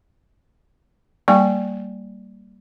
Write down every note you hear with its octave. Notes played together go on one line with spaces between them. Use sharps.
G3 A#3 D5 G5 G#5 C#6